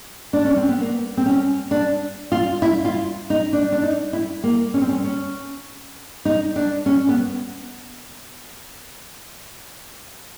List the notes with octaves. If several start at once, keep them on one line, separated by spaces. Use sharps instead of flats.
D4
C#4
C4
B3
A#3
C4
C#4
D4
F4
E4
F4
D#4
D4
D4
D#4
E4
A#3
C#4
C4
C#4
C#4
D#4
D4
C#4
B3